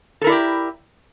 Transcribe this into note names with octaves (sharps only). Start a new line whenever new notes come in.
E4 G4 A4 A#4 D5